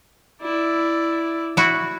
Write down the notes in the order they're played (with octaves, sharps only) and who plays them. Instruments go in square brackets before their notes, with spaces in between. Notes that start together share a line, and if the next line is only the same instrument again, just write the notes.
[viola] E4 D5
[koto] E4 F#4